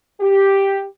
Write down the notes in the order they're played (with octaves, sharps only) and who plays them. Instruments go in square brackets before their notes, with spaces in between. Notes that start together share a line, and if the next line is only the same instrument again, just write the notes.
[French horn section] G4